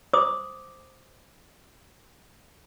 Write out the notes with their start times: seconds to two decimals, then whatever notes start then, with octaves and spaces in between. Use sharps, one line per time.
0.13 C5 D6 D#6